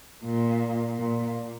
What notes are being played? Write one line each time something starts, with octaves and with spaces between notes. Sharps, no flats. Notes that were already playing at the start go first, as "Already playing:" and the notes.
A#2
A#2